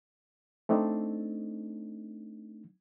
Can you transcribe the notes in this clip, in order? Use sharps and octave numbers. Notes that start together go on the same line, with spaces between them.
A3 C4 D4 D#4